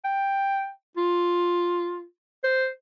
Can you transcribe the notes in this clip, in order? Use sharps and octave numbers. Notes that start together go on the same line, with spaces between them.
G5
F4
C5